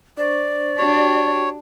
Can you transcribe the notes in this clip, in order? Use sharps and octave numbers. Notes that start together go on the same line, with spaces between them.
D4 C5 D5 C#6
D4 F#4 G4 C#5 G5